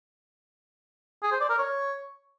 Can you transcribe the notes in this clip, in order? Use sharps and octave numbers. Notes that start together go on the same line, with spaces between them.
G#4
C5
D5
A#4
C#5